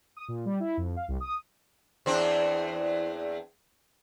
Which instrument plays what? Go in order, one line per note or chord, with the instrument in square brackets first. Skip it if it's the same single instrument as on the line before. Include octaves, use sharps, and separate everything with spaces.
[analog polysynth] D#6
A#2
G3
E4
F2
F5
C2
D#6
[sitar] E2 C4 D4